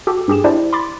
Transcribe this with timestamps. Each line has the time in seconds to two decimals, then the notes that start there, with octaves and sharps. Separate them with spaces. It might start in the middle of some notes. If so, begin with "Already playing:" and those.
0.07 F#4 G4 A4
0.28 G2 G4 G#4 E7
0.44 D4 E4 G4 C5 D5
0.73 B5 C6 D6 A6